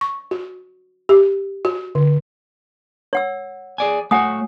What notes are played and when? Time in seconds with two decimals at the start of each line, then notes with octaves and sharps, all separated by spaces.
0.01 C#6
0.31 F#4
1.09 G4
1.65 F#4
1.95 D3
3.13 C#5 F#5 E6
3.78 G#4 D5 G#5
4.11 A3 F#4 C#5 F#5 G#5 D#6